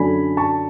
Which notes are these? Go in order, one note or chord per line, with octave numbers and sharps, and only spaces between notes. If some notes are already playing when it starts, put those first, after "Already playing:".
Already playing: F#2 D3 F#3 A3 D4 G#5 B5
A5 C#6